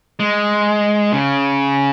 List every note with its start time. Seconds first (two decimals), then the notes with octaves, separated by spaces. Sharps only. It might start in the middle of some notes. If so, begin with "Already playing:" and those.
0.20 G#3
1.13 C#3